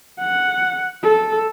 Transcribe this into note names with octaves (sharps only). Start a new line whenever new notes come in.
F#5
A4